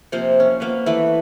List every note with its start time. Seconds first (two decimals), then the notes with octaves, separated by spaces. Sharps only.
0.12 C3 F3 A#3 C5
0.40 C#4
0.60 A#3 B3 B4
0.86 E3 A3 B4